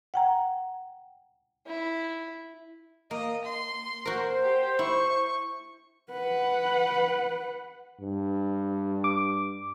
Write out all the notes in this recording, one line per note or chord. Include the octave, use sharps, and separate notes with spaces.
F#5 G5 A#5
E4
A#3 D#5
C6
F#4 A#4 C5
G4
E4 C#6
B4 F#5
G2
D6